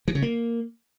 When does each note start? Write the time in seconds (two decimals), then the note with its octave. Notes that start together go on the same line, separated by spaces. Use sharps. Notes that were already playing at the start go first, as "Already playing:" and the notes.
0.08 E3
0.15 C#3
0.22 A#3